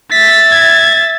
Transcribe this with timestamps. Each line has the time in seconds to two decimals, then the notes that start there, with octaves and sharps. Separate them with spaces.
0.12 E5 A6 B6
0.52 G#6